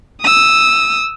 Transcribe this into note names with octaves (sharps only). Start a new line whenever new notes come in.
D#6 E6